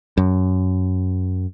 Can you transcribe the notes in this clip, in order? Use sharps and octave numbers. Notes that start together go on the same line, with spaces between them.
F#2